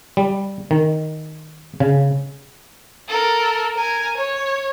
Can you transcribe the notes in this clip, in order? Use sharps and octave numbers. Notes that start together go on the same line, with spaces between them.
G3
D#3
C#3
A4 A#4
A#4 G#5
C#5